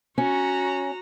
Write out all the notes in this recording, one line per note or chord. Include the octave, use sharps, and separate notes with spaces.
C#4 F#4 A#5